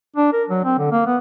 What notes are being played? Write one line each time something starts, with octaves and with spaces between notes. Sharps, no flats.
D4
A#4
F#3
C4
D3
A#3
B3